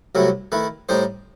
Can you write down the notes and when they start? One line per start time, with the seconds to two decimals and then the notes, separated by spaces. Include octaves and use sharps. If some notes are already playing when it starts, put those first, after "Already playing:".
0.15 C2 C3 F#3 A3 E4
0.52 D#3 A3 E4 B4
0.89 A2 G3 D#4 G4 C5